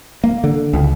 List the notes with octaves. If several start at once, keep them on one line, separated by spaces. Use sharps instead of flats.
A#3
D3
C#2